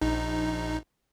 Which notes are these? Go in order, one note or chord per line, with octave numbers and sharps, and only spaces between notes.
A#1 D#4